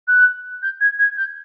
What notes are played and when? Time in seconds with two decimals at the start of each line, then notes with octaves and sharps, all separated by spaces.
0.07 F#6
0.62 G6
0.80 G#6
0.98 G#6
1.17 G6